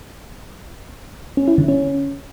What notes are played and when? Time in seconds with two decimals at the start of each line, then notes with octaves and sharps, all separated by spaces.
1.37 C#4
1.48 E4
1.58 D3
1.68 C#4